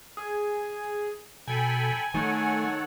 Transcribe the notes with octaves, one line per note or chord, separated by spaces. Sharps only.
G#4
B2 A4 G5 G#5 B5
D#3 A3 A4 C#5 F#5